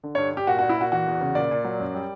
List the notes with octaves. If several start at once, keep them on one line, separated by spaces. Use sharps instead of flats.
D3
G2 C#5
G2 G4
A#2 F#4
A#2 F#4
E4
A#2 F#4
E3 F#4
E2
C#3
A#2 D5
A#2
F#3
F#2
G3